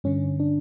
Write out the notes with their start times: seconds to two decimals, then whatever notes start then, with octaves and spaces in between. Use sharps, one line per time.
0.04 G2 D3 C#4
0.40 D4